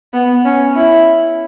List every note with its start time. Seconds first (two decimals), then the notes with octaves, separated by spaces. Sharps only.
0.13 B3
0.45 C#4
0.76 E4